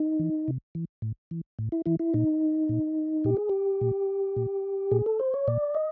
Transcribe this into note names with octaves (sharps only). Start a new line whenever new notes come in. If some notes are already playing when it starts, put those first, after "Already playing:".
Already playing: D#4
E3
C3
E3
A2
E3
A2
E4
E3 E4
E4
A#2 D#4
A#2
A#2 G4
G#4
G4
A#2
A#2
A#2 G#4
A4
C5
C#5
A#2 D5
D#5